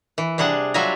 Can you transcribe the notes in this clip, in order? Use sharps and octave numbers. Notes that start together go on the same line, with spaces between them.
E3
C3 G3 D4 G#4 F#5
F#3 G3 F4 E5 G#5 A#5